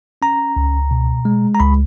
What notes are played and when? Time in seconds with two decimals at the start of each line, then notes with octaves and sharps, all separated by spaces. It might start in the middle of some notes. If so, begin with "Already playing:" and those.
0.22 C#4 A#5
0.56 C#2
0.91 B2
1.25 G#3
1.55 A#5
1.60 C#2 B5